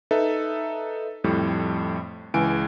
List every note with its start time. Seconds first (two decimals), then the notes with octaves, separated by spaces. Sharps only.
0.11 D#4 A4 B4 E5
1.24 F2 A2 G3
2.34 C#2 E3 G#5 D7